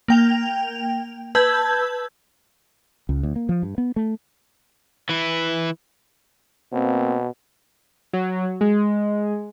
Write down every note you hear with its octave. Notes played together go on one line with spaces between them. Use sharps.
A#3 G5 F7
B4 A5 E6 G6 G#6
C#2
D2
A#3
F3
G2
B3
A3
E3 E4
B2 A#3 C4
F#3
G#3